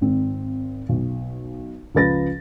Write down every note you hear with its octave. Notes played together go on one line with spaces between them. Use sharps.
G#1 C4
B1
C#2 F3 B4 A6 A#6